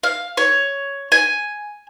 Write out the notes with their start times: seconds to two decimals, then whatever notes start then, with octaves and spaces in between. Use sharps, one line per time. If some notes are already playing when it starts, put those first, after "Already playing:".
0.03 F5
0.37 C#5
1.12 G#5